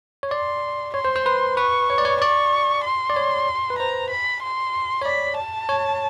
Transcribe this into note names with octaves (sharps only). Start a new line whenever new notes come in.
C#5
D5 C6
C#5 C6
C5
C5
B4
B4 C#6
C#5
D5
C#5
D5 C#6
C6
D5
C#5
B4
C5 A#5
B5
C6
C#5
D5 B5
A5
C#5